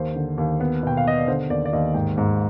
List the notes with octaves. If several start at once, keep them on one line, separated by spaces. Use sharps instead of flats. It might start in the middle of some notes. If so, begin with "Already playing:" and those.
Already playing: D#2 C5
D3
D#2
B3 B4
B2 G5
F5
B3 D#5
D5
D3 C5
D#2 D5
D5
D#2 D#5
G#2 G5
G#2